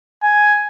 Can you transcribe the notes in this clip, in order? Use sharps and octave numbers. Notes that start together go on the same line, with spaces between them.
G#5